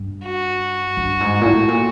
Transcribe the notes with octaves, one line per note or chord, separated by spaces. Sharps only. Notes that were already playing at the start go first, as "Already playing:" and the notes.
Already playing: G2
F#4
G2
G#2
A#2
A2
A#2